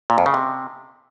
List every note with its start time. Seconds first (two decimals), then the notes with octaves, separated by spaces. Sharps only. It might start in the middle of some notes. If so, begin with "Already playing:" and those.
0.10 A#2
0.18 F2
0.26 C#3
0.34 C3